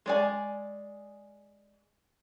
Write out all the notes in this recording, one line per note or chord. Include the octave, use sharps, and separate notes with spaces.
G#3 D5 G#5